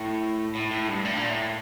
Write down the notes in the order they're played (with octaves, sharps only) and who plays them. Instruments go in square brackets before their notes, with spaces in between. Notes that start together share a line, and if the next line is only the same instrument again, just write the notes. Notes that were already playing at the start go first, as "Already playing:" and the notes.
Already playing: [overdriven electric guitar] A2
A2
A2
G2
A2
A#2
A2